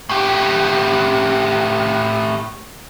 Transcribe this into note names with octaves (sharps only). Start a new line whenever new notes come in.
A2 G4